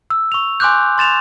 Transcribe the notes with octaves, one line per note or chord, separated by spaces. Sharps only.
E6
C#6 F7
G#5 C6 D6 F#6 G6
C6 A6 E7 F7